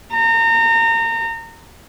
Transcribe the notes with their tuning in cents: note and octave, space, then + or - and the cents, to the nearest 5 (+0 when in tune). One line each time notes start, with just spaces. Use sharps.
A#5 -30